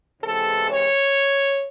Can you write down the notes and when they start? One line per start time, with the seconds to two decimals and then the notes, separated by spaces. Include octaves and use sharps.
0.22 E2 C3 E3 G#3 A4
0.68 C#5